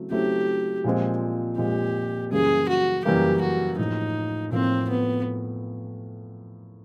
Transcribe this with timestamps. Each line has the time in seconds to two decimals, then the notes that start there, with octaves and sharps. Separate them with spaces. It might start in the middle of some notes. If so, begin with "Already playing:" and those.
Already playing: C#3 F#3 A3 C4 E4
0.11 C#3 F#3 A3 C4 E4 G4
0.84 A#2 F3 G#3 C4
1.58 A#2 F3 G#3 C4 G4
2.31 F#2 C#3 E3 G3 A#3 G#4
2.68 F#4
3.05 F#2 C#3 E3 G3 A#3 G4
3.41 F#4
3.78 A2 F3 A#3 D#4
4.52 A2 F3 A#3 C4
4.89 B3